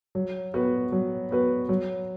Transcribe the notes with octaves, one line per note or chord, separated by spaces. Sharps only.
F#3
B3 F#4 B4
F#3
B3 F#4 B4
F#3